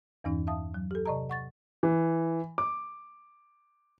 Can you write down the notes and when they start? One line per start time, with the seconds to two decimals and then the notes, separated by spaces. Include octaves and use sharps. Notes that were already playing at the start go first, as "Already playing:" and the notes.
0.24 E2 G2 E3 C#4 D#4
0.47 E5 F5 A5 D#6
0.74 F#3
0.91 G4 A4
1.06 C3 D5 D#5 A5 A#5
1.30 F#5 C#6 A6
1.83 E3
2.58 D6